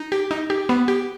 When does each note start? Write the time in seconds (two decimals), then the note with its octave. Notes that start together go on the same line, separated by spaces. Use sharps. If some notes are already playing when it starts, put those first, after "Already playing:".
Already playing: D#4
0.12 G4
0.31 D#4
0.50 G4
0.69 B3
0.88 G4